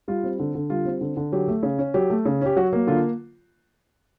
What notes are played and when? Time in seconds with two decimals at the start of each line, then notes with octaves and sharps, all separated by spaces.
0.08 G3 F4
0.23 C4
0.39 D3
0.55 D3
0.70 G3 F4
0.85 C4
1.01 D3
1.17 D3
1.32 F#3 G4
1.48 A3
1.63 C#3
1.78 C#4
1.94 F#3 G4
2.10 A3
2.26 C#3
2.41 C#4 G4
2.56 F#3 F#4
2.73 A#3
2.87 D3 F4